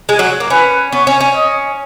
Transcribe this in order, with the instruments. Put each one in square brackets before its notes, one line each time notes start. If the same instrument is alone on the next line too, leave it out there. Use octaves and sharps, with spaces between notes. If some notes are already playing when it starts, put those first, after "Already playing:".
[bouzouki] G#3
F#3
A#3
[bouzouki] C#4 [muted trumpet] B4
[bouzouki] B3 [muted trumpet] C#5
[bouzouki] C#4
C#4
[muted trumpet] D#5